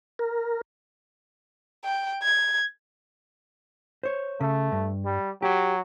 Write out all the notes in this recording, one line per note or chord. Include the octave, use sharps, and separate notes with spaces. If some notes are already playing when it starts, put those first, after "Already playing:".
A#4
G5
G#6
C5 C#5
C#3 A3
G2
G3
F#3 G4